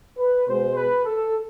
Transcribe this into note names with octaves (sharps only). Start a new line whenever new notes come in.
B4
B2 G#3 B3 C5
B4
A4